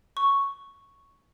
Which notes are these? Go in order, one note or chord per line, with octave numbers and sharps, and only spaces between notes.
C#6